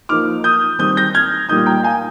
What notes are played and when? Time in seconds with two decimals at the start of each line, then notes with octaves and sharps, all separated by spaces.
0.09 F3 A#3 D#4 D6 F6
0.44 D#6 G6
0.79 D#3 G3 C4 D#6 G6
0.97 G6 A#6
1.14 F6 G#6
1.49 A#2 G3 A#3 D#4 D#6 G6
1.66 G5 A#5
1.83 F5 G#5